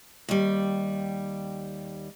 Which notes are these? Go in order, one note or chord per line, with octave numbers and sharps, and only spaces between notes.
D#2 G3